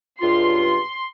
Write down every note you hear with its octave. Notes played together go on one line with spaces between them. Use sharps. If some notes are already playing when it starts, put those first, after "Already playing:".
C#2 G2 F4 C6